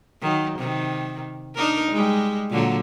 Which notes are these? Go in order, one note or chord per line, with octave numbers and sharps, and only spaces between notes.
D#3 F#3
C3 D#3
D4 D#4 A#4
G3 G#3
A#2 D3 F#3